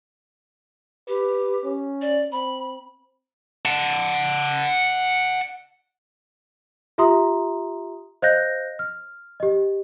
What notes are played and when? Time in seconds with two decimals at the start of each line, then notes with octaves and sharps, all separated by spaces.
1.08 G4 B4
1.63 C#4
2.01 D5
2.32 C4 B5
3.65 F#5 A5
6.98 F4 G4 E5 A#5 C6 D#6
8.22 C5 D#5 F5 F#6 G6 A#6
8.79 F6
9.40 G4 D#5